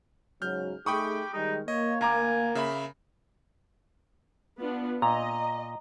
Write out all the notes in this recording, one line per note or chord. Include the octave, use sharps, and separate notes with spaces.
G#2 C#3 F#3 F6 G6
A3 D#4 G4 G#4 G5 B5 C#6 D#6
D#3 G3 G#3 D#4
A#3 C#5 D#5
D2 F5 G#5 A#5 D6
C#3 E5 B5
B3 D4 F4
A#2 D#5 A#5